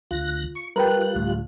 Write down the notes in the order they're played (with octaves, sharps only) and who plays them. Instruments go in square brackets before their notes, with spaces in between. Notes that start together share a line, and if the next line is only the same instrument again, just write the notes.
[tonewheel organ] D2 F#6 A#6 [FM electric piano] F4
[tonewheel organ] C#6
[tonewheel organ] G3 F4 F#6 [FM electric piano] A#4 B4 G5
[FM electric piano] D2 A2